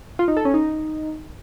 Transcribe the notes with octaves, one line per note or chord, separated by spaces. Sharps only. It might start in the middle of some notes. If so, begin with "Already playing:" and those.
F4
D#4
A4
C#4
D#4